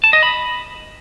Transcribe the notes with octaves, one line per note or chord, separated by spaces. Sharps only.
A5
D#5
B5